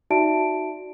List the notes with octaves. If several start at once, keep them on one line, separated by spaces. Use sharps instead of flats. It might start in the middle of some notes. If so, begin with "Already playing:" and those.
D#4 F#4 D5 E5 A5 D7